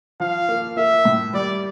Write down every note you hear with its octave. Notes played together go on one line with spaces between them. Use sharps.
F3 F5
A#3
A#3 E5
A2
G3 D5